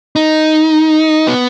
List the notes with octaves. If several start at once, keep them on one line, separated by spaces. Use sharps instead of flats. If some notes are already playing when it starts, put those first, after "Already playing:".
D#4
B3